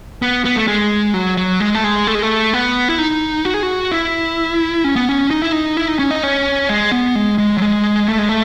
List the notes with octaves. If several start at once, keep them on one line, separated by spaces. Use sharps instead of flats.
B3
B3
A3
G#3
F#3
F#3
G#3
A3
G#3
A3
G#3
A3
B3
E4
D#4
F#4
G#4
F#4
E4
C#4
B3
C#4
D#4
E4
D#4
E4
D#4
C#4
D#4
C#4
G#3
B3
G#3
G#3
F#3
G#3
A3
G#3
A3